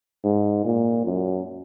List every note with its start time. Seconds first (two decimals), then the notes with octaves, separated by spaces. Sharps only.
0.24 G#2
0.64 A#2
1.06 F#2